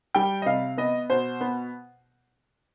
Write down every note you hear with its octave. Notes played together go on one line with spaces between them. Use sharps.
G3 G5
D#5
C3 F5
B3 D#5
B2 C5
B3